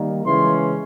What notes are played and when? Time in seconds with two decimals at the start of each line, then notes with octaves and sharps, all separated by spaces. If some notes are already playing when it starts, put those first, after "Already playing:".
Already playing: D#3 G3 A#3
0.26 C#3 E3 G#3 C#4 C6